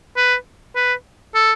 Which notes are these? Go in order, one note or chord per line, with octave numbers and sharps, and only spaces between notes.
B4
B4
A4